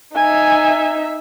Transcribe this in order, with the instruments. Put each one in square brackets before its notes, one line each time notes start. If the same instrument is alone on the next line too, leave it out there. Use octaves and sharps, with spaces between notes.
[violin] D#4 E5 [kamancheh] G#5